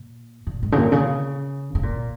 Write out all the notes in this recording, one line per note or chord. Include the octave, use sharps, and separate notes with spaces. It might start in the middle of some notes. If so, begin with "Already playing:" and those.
Already playing: A#2
A#2
G#2
C#3
A#2
C#3
C#3
A#2